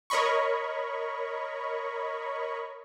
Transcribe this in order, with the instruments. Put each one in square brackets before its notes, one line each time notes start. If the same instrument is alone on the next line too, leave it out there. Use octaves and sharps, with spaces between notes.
[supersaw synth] A#4 C#5 D#5 B5 C#6